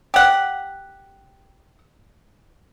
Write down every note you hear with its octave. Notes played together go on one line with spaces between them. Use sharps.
G4 F#5